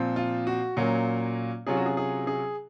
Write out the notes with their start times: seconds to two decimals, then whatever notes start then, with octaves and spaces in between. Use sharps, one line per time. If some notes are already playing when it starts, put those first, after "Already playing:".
Already playing: A#2 F3 C4
0.16 F4
0.47 F#4
0.77 A#2 F#3 A#3 C#4
1.67 C3 F#3 C#4 F4 G#4
1.77 F#4
1.86 G#4
1.97 G#4
2.27 G#4